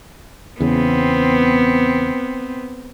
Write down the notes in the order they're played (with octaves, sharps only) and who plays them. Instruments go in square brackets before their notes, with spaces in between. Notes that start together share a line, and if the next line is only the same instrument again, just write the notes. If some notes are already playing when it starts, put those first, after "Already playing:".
[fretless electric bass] E2 C#3 [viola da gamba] B3 C4